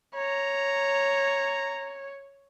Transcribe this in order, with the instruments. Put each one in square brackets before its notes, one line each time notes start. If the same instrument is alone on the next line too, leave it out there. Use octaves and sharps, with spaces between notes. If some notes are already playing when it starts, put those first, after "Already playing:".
[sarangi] C#5 [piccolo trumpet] A#5